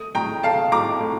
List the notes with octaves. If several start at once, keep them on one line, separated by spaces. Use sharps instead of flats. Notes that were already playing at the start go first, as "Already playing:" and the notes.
Already playing: A3 D#6
A2 G5 A#5
A3 F5 A5
A2 A#5 D6
A2